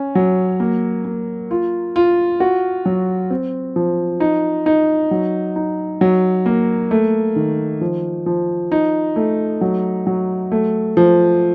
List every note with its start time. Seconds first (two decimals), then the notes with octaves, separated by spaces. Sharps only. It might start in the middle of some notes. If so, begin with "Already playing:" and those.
Already playing: C#4
0.15 F#3
0.60 A#3
1.05 A#3
1.51 F4
1.96 F4
2.40 F#4
2.86 F#3
3.30 C4
3.76 F3
4.20 D#4
4.66 D#4
5.11 F#3
5.56 D#4
6.01 F#3
6.46 A#3
6.91 A3
7.36 D#3
7.81 F3
8.26 F3
8.72 D#4
9.16 A3
9.61 F#3
10.07 F#3
10.52 A3
10.97 F3